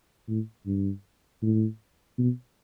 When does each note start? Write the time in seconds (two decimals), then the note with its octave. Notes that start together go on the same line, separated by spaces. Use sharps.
0.28 A2
0.66 G2
1.42 A2
2.18 B2